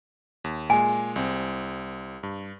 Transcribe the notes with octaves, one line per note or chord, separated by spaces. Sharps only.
D#2
A#2 G#3 G#5
C2 C4
G2